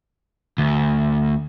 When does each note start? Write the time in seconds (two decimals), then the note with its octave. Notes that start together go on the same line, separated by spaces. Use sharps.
0.58 D2